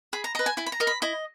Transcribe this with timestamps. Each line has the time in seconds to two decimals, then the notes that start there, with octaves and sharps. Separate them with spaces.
0.13 G#4 B5
0.24 A#5
0.35 D#5 A#5
0.39 B4
0.46 G#5
0.57 E4 G#5
0.66 B5
0.72 A#5
0.80 A#4 D#5
0.87 B5
1.02 E4 D#5